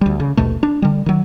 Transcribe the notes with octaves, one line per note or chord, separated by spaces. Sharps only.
D2 G3
C#3
A#1 D#2 B2 A3
D4
D3 G3
D#3 F#3